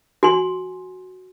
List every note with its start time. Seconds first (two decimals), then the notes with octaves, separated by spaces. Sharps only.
0.23 F#4 G#5 C6